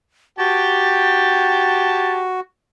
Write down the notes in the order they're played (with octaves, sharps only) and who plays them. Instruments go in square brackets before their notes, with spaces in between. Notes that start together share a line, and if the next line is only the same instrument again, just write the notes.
[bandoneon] F#4 [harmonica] G4 G5 A5 [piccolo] A6